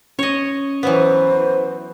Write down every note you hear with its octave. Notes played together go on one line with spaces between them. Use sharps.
C#4 C#5 D#5
E3 F#3 B3 C5